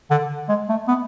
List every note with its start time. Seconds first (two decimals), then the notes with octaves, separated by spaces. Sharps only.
0.10 D3
0.49 G#3
0.69 A3
0.88 B3